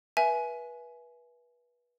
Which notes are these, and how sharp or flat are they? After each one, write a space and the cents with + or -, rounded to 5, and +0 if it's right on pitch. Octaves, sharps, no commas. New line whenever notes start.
B4 -25 E5 +10 G#5 +20